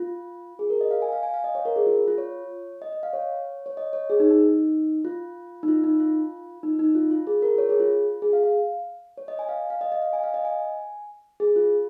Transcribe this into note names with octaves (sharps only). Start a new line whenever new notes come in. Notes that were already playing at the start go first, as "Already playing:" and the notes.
Already playing: F4
G#4
A#4
D#5
F5
G#5
F5
G#5
F5
D#5
C#5
A#4
G#4
F4
F4
C#5
D#5
D#5
F5
C#5
C#5
D#5
C#5
G#4
D#4
D#4
F4
D#4
F4
D#4
F4
D#4
D#4
F4
F4
G#4
A#4
C#5
G#4
F4
G#4
F5
F5
C#5
D#5
G#5
F5
F5
D#5
D#5
F5
G#5
F5
D#5
G#5
G#4
F4